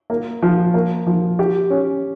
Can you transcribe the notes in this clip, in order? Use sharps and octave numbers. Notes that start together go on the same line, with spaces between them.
A#3
F3
A#3
F3
G4
C#4